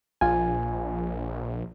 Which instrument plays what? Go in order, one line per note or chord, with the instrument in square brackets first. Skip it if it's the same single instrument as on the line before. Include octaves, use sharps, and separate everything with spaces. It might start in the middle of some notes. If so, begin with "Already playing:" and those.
[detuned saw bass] A#1 [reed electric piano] F4 G#5